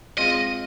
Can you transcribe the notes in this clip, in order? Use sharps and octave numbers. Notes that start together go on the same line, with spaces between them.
G#3 C4 F4 D#5